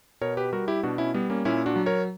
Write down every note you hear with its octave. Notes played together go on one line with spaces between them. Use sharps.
B2 A#4 C#5
G4 B4
G3 F#4 A#4
E4 G4
B2 D4 F#4
C#4 E4
G3 B3
A#3 C#4
A#2 C#4 E4
D4 F#4
F#3
A#4 C#5